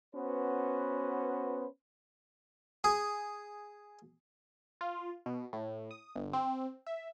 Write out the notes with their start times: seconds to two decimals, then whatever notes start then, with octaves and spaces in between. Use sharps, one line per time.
0.14 B3 C#4 F#4 B4 C5
2.84 G#4
4.81 F4
5.26 B2
5.53 A2
5.91 D#6
6.16 G1
6.33 C4
6.87 E5